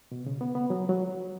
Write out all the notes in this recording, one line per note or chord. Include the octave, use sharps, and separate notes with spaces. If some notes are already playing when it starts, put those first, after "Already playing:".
B2
C#3
B3
B3
F#3
F#3